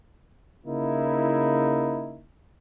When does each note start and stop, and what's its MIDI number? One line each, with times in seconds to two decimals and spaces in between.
0.65 2.23 49
0.65 2.23 58
0.65 2.23 63
0.65 2.23 64